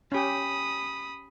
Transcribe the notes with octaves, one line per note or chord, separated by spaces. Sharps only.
C#4 G4 B5 D#6